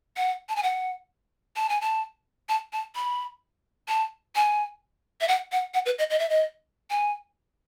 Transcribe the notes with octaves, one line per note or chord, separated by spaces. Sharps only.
F#5
A5
G#5
F#5
A5
G#5
A5
A5
A5
B5
A5
G#5
E5
F#5
F#5
F#5
B4
D#5
D#5
E5
D#5
G#5